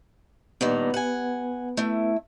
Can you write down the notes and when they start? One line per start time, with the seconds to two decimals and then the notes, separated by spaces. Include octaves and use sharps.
0.61 G2 A#2 D#3 B3 B4
0.94 F#5 G#5
1.77 A3 E4